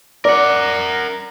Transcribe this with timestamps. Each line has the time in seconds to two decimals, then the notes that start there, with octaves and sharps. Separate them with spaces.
0.25 A#4 D5 F#5